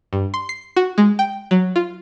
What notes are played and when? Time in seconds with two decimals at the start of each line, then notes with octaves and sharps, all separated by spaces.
0.13 G2
0.34 C6
0.49 C7
0.77 F#4
0.98 G#3
1.19 G5
1.51 F#3
1.76 F4